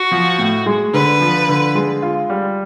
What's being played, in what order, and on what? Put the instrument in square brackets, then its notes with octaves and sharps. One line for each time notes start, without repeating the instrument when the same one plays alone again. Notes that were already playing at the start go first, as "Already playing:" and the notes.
Already playing: [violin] F#4
[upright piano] F3
A2
G#3
[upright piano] D3 [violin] B4
[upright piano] F3
D3
G#3
F4
G3